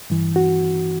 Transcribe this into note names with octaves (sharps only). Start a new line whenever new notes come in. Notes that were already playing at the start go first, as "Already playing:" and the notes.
G2 E3
F#4